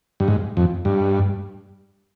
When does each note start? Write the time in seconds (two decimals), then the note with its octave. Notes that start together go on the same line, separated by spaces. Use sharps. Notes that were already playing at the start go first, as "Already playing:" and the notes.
0.20 G2
0.28 G#2
0.57 F2
0.85 G2